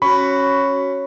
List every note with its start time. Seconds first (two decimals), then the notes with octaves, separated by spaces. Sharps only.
0.02 C#4 F#4 B5 C#6